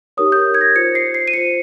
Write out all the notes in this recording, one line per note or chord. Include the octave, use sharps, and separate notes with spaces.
D#4 G4 A#4 C#5 D#6
G6
G#6
A#6
F4 C5 C#7
C7
C7
D#7
F4 C5 C#7